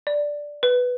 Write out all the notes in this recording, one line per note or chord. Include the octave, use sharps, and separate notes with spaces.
D5
B4